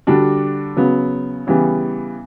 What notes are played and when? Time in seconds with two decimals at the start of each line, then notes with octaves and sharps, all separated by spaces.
0.07 D3 G3 D4 F#4
0.76 C#3 F#3 B3
1.47 C#3 E3 G3 B3